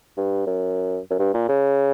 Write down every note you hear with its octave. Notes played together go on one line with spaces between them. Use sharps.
G2
F#2
F#2
G2
A#2
C#3